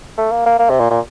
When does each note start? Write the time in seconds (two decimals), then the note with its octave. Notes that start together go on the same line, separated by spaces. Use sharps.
0.18 A3
0.32 A#3
0.46 A#3
0.59 A#3
0.70 C3
0.80 A#2
0.90 A#2